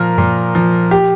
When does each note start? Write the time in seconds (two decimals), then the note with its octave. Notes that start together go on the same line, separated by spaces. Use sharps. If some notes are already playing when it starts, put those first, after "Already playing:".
Already playing: A#2 F3 A#4
0.18 A#2
0.55 F3
0.91 G4